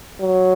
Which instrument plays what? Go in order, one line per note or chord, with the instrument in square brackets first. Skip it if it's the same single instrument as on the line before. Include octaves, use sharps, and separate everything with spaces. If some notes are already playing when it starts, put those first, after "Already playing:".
[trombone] F#3